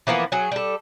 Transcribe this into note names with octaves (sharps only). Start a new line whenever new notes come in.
E3 F3 A#3 B3
F#3 G#4
G3 A4